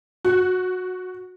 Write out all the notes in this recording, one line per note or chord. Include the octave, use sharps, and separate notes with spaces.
F#4